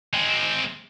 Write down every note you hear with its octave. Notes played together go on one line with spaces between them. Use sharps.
G#3 C4